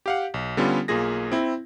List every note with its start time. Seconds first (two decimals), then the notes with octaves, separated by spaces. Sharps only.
0.06 G4 F5 F#5
0.34 B1
0.57 D3 G3 B3 C#4 F4 A4
0.88 B1 A#3 F4 G#4 A#6
1.32 C4 E4